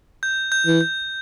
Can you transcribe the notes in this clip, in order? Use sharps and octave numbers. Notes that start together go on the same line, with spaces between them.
G6
G6
E3
G6